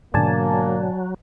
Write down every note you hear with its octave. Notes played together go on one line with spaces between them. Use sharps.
G#2 B2 D3 F#3 A#3 D5 G#5 A5